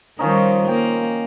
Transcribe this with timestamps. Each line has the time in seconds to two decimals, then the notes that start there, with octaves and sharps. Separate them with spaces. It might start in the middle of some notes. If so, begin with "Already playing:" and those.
0.19 D#3 F3 G3 C#4 D#4
0.68 A#3 G5